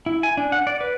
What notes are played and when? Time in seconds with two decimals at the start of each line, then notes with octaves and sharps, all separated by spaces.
0.06 E4
0.23 G#5
0.37 D4
0.52 F#5
0.67 D5
0.81 B4